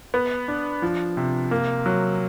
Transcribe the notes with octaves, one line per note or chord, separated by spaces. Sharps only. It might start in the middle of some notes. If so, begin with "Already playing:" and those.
B3
D4
F3
C3
A#3
F#3